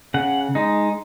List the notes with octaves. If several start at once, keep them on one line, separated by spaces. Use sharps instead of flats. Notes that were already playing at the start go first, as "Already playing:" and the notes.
C#3 F#5
G#3 D#4